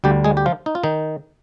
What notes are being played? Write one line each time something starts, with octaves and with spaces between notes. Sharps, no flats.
D2 D3 G3 G4
G#3 G#4
G4
F3 F4
D#4
F4
D#3 D#4